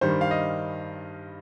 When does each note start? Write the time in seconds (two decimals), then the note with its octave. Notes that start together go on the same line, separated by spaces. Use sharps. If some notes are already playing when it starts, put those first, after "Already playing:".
0.01 G2 D#3 G3 C5
0.21 F5
0.31 D#5